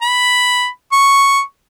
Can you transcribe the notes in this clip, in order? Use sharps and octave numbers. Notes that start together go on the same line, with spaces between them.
B5
C#6